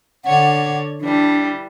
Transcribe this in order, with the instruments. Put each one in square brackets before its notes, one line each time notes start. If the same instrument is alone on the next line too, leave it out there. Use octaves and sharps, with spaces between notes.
[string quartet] D3 C#5 D5 [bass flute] F#5
[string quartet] E3 G3 [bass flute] D4